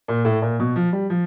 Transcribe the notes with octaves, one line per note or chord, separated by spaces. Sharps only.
A#2
A2
A#2
B2
F3
G3
F3